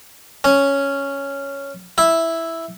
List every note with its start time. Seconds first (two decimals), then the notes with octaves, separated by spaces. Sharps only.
0.44 C#4
1.98 E4